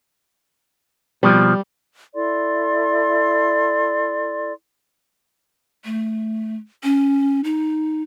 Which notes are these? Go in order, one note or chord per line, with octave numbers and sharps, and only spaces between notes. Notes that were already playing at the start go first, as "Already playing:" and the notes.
B2 F3 G3
E4 A4 D5 C6
A3
C#4
D#4